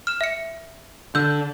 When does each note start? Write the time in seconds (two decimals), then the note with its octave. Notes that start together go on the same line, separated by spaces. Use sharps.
0.07 F6 E7
0.21 E5 C#7
1.15 D3 E6 G6